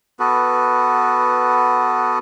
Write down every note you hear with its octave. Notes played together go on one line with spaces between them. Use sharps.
B3 F#4 A4 B4